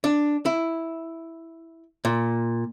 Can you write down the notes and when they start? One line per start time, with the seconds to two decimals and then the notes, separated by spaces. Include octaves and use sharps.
0.04 D4
0.46 E4
2.05 A#2